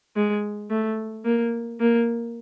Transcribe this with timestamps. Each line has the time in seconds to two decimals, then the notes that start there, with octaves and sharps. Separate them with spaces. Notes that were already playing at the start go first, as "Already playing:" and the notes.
0.16 G#3
0.70 A3
1.25 A#3
1.80 A#3